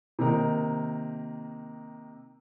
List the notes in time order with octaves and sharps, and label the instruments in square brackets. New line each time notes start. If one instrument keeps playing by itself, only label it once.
[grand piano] C3 D#3 A#3 D#4 A#4